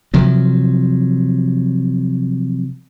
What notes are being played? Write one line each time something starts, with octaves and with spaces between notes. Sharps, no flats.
C3 F3 F#3